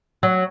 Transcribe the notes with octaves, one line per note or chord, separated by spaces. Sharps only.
F#3